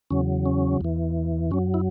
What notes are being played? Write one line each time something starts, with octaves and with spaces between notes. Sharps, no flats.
E2 C#3 F#3 C#4
C#4
E2 E3
F#2 F#3 C#4
E4